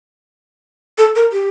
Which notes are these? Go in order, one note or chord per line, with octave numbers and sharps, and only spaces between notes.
A4
A#4
G4